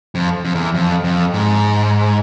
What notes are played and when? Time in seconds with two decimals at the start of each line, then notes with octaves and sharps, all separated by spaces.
0.15 F2
0.45 F2
0.55 E2
0.75 F2
1.04 F2
1.34 G#2